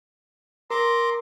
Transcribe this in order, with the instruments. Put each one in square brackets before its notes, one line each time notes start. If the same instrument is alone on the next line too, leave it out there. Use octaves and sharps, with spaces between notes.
[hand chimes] A#4 [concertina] A#5 C6 D6